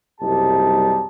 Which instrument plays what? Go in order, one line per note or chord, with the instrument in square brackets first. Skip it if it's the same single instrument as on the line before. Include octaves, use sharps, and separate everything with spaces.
[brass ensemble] F#1 C2 G3 D#4 G4 A5